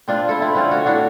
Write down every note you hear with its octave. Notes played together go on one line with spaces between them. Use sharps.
C4 D4 F4
E4 A4
C4 E4
D3 C4 C#4 F4
F#4 C#5
A2 D4 F#4